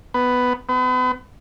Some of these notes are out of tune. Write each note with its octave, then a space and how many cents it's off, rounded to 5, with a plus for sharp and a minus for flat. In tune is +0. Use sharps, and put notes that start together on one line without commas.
B3 +10
B3 +40